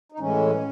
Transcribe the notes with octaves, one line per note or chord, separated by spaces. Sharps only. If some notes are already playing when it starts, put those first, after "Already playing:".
D#4
A2 E3 G#3 C#4